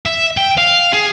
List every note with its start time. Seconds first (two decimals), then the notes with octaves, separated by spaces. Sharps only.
0.06 E5
0.37 G5
0.58 F5
0.93 G#4